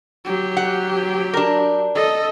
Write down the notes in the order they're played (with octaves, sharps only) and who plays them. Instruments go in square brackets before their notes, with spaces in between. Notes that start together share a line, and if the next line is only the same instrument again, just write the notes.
[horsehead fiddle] F#3 G4
[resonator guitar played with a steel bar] F#5
D4 A#4
[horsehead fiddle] A4 D#5